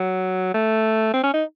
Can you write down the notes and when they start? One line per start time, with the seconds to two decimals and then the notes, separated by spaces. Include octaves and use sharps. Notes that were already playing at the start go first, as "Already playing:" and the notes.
Already playing: F#3
0.54 A3
1.14 C4
1.24 C#4
1.33 D#4